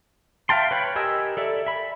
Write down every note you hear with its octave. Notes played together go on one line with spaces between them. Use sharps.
E5 F5 G5 A5 C6
B4 C#5 G5 B5
G4 A#4 D#5 G#5 E6
A4 D5 E5
E5 B5